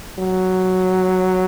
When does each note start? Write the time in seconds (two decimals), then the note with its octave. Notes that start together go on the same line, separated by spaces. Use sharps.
0.19 F#3